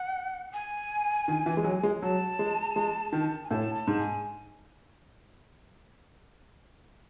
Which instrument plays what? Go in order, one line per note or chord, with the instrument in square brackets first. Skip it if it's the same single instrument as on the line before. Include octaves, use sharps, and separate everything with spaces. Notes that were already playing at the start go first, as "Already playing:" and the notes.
Already playing: [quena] F#5
G#5
[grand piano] D#3
E3
G#3
F#3
G#3
[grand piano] F#3 [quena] A5
[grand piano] G#3
G#3
D#3
[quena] G#5
[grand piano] A2 [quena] A5
[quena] A5
[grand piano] G#2
[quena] G#5